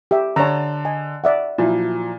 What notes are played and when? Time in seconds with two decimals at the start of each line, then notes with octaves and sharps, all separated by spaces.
0.11 G4 E5
0.36 D3 C#5 A5 A#5
0.85 D#5 G#5
1.24 D5 E5 F#5
1.58 A#2 F3 F#3 E4